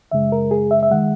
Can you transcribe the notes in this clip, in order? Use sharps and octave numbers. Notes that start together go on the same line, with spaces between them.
F#2 C#3 G#3 E5
A#4
G#4
E5
E5
D#3 G#3 F#5